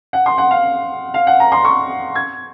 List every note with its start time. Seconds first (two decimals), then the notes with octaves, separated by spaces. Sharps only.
0.13 F#5
0.26 C6
0.38 F#5
0.51 F5
1.14 F5
1.27 F#5
1.40 A#5
1.52 C6
1.65 C#6
2.15 G#6